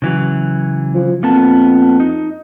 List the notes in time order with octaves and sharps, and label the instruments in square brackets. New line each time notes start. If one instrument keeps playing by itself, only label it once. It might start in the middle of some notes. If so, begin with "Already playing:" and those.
[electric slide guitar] C#3 E3 F#3
[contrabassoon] F3
[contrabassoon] F2 [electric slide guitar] A#3 B3 A5
[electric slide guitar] D#4